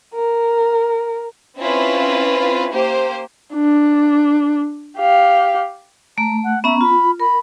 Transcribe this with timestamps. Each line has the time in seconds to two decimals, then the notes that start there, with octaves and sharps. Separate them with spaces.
0.15 A#4
1.58 C4 C#4 E4 F4 B4
2.70 A#3 G4 C5
3.54 D4
4.98 G4 F5
6.18 A3 A#5
6.44 F#5
6.64 B3 C#4 E5 A#5
6.81 F4 B5
7.20 A#4 B5